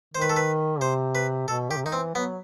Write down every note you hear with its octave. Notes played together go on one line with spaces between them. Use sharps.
D#3 C5
B4
A4
B4
C3 C5
B4
B2 A4
D#3 G4
C3
D#3 D#4
E3 C4
F#3 B3